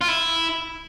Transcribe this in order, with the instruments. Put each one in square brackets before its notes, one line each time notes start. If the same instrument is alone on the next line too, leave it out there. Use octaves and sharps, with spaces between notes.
[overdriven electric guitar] F4
E4